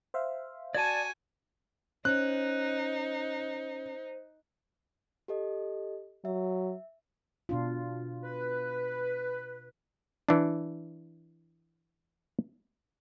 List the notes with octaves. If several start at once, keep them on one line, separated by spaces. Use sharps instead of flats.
C5 E5 F5
F#4 D5 G#5 A5 G#6 D#7
C#4 D#4 C5 F#6
G4 A4 D#5
F#3 E5
B2 D4 F4
B4
E3 D4